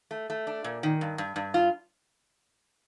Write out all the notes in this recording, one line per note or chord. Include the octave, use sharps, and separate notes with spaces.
A3
A3
D4
A#2
D#3
G2
G2
G2
F4